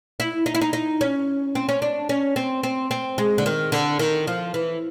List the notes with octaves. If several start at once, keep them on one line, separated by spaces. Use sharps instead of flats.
E4
D#4
E4
D#4
D#4
C#4
C4
C#4
D4
C#4
C4
C4
C4
G#3
D3
D#3
D3
D#3
F3
E3